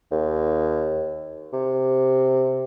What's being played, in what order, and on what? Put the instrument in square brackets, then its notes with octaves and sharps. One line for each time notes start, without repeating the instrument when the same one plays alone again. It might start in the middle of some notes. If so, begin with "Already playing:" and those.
[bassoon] D#2
C3